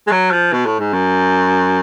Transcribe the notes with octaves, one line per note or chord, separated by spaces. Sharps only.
G#3
F#3
F3
B2
A2
G#2
F#2